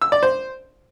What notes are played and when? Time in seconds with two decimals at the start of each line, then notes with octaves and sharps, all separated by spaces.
0.02 E6
0.12 D5
0.23 C5